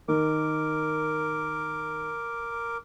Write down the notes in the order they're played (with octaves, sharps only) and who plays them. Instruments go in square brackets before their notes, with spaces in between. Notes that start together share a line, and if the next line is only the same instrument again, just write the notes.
[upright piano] D#3 [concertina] A#4 D6